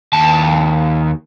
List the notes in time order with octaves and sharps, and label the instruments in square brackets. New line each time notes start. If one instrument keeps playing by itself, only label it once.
[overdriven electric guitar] D#2 A5